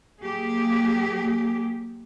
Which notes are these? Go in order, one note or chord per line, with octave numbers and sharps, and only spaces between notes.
F#3 A#3 G4 G#4